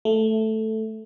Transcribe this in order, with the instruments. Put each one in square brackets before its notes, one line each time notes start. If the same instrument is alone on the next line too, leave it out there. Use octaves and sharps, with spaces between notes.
[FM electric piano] A3